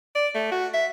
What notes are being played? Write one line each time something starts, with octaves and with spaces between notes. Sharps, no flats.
D5
A3
F#4
E5